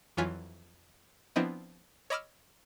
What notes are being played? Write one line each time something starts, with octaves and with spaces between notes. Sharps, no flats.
F2 E3 F#3 F4 G#5 B6
F3 B3 C4 D4 E4 D#5
C#5 D#5 B5 D6 E6 F6